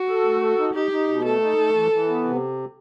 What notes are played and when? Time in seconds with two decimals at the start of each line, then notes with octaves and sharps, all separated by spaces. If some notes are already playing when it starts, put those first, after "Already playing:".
Already playing: F#4
0.08 A4
0.25 A3
0.42 A4
0.58 D#4
0.74 D#4 G4
0.91 D#4
1.09 B2
1.24 A3 A4
1.41 D#4
1.58 A3
1.75 E3
1.91 E3
2.08 B3
2.25 C3